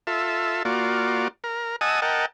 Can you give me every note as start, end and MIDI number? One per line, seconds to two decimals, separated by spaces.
0.07 0.63 65
0.07 0.63 69
0.07 0.63 76
0.65 1.28 58
0.65 1.28 65
0.65 1.28 66
0.65 1.28 74
1.44 1.76 70
1.81 2.00 75
1.81 2.00 78
1.81 2.00 80
1.81 2.00 81
1.81 2.00 87
1.81 2.00 88
2.02 2.26 70
2.02 2.26 75
2.02 2.26 78
2.02 2.26 79
2.02 2.26 81